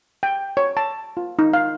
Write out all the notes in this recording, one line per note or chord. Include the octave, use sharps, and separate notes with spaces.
G5
C#5
A5
F4
D#4
F5